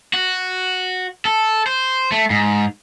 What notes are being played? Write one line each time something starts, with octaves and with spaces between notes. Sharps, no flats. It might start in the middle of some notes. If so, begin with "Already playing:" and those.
F#4
A4
C5
A3
G#2